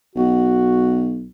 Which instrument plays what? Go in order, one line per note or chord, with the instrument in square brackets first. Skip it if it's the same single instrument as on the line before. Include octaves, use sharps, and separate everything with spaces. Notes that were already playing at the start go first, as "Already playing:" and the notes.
[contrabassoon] B1 [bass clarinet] F#4